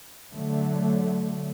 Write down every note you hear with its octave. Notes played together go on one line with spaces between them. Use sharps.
D3 F#3 A3